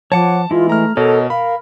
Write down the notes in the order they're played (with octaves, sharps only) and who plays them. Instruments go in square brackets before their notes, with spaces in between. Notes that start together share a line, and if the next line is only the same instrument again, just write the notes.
[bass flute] F3 [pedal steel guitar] C#5 F#5 D6 [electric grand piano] A5
[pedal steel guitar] E3 G#3 E4 [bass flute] F4
[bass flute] A3 [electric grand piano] A#5 F6
[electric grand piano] B2 [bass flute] A4 [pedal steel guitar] A#4 C#5 D#5
[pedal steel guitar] A#4 [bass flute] F5 [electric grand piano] B5